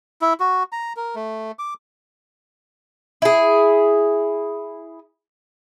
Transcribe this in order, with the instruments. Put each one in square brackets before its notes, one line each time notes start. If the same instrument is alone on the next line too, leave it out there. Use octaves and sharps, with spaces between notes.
[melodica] E4
F#4
A#5
A#4
A3
D6
[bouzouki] E4 G#4